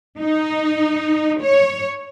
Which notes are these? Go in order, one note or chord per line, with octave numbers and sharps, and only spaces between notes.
D#4
C#5